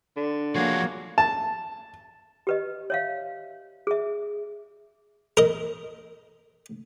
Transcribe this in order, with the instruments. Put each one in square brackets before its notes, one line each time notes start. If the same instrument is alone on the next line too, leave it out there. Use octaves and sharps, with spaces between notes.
[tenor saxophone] D3
[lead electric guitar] F3 G#4 [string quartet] A#3 [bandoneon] F#4 C#5
[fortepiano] A5
[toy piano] G4 B4 D#5
C#5 E5 F5
G#4 E5
[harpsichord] A#4 D#5